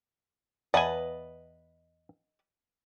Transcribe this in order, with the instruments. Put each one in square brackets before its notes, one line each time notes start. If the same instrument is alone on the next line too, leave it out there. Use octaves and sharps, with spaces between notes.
[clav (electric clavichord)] E2 G#5 [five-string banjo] B4 D#5 A5